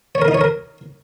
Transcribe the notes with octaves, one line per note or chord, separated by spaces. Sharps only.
C#5
A#4
D#4
C#5
A#4